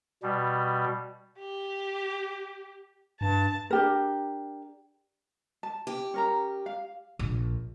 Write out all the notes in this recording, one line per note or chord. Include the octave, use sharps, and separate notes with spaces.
B2 G3
G4
G2 A5
D4 G4 A#4
A5
G4
C#4 A#4 A#5
F5
A#1